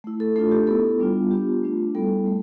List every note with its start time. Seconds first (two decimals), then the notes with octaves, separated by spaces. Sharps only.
0.04 A3 E4
0.20 A4
0.36 A3 D4 F4 A4
0.52 G4
0.67 B3 E4 A4
1.00 G3 B3 D4 F4
1.31 B3 D4 F4 G4
1.63 A3 D4 F4
1.94 G3 B3 E4 A4
2.26 A3